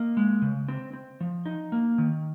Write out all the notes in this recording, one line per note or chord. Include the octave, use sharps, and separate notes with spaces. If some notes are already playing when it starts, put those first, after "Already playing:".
Already playing: A#3 D#5
G#3
C#3
C4
C4
F3
D#4
A#3
D#3